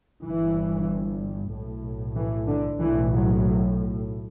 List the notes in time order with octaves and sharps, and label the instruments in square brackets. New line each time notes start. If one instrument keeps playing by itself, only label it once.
[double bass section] G1 G2 E3
B1 A2
E3
D3
B1 A2 E3
F#3